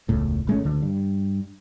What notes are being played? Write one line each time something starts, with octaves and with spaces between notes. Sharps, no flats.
E1 C#2 A2
G#1 G#3 A3 C#4
D2 D3
G2